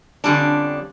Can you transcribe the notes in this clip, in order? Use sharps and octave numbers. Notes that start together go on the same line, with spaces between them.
F2 D3 G3 C#4 D4